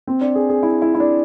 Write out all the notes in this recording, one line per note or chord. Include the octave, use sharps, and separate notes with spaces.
C4
D4
G#4
G#4
E4
E4
E4
D4